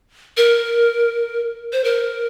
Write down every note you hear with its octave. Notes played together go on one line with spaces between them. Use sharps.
A#4
C5
A#4